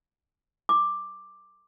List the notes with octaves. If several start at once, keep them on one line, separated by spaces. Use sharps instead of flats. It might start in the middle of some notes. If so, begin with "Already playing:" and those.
D6